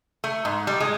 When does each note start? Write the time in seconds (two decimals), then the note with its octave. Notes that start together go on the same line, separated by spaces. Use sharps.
0.24 A3
0.45 G#2
0.67 G3
0.80 G#3